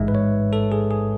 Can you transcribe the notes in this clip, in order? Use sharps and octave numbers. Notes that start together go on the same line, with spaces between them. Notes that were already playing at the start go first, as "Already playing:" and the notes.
Already playing: A1 G#2 G#3 E5
B4
C#5
A4
G#4
G#4